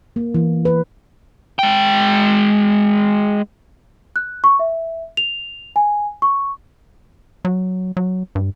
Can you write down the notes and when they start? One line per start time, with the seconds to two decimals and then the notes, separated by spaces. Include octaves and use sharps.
0.16 A#3
0.34 E3
0.65 B4
1.59 G#3 G5
4.16 F#6
4.44 C#6
4.59 E5
5.17 F7
5.76 G#5
6.22 C#6
7.45 F#3
7.97 F#3
8.35 G2